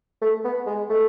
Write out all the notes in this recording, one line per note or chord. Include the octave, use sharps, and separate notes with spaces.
A3
B3
G#3
A3